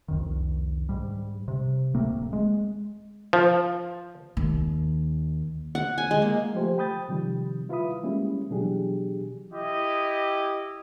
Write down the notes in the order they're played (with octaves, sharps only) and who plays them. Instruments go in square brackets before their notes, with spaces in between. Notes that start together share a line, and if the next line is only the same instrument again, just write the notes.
[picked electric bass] C2 F2 D#3
G#2 G3
C3
D1 A3 A#3 C4
G#3
[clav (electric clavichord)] F3
[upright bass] D#2
[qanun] F#5
G#5
G#3
A#3
[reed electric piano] F3 A3 G4 C5
G5 B5 D#6 G6 A6
C3 D#3 F3 G3
E4 F4 B4 E5 B5 D#6
G3 G#3 A#3 C#4 E4
B2 E3 F#3 D4 G4 G#4
[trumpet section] E4 G4 D#5